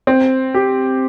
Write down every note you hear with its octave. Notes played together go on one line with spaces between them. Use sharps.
C4
G4